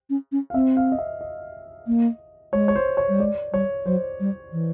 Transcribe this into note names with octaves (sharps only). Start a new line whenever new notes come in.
C#4
C#4
F5
C4 E5
F5
D#5
E5
D#5
A#3
G#3 C#5
C#5
C5
C#5
G3
G#3 D5
G3 C#5
F#3 C5
G3
E3